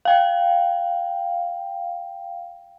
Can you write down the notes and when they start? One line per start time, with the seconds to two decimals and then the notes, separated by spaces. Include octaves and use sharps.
0.05 F5 G5